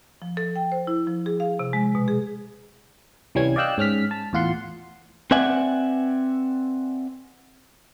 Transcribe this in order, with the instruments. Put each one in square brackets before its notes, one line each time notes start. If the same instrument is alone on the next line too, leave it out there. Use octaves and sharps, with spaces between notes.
[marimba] F3
A4
G5
C5
E4
F3
G#4
F5
C3
G#3
B2
G#4
[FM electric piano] C2 E3 G3 C#4 G#6
D5 D#5 F5 G5 E6 F#6
G#2 C#4 F6 B6
A5
E2 A2 F4 F#5 C6
[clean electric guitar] C4 B4 D5 E5 F#5 G#5